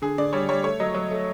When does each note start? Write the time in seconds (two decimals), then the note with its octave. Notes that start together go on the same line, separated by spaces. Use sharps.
0.02 D3 G#4
0.18 D3 D5
0.33 G3 C#5
0.49 G3 C#5
0.64 A3 C#5
0.80 F#3 D#5
0.95 F#3
1.11 A3